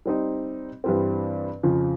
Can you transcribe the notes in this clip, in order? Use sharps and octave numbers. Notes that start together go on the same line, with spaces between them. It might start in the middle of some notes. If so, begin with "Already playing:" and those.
G3 C4 D#4
G2 E3 G3 C4
F2 C#3 F3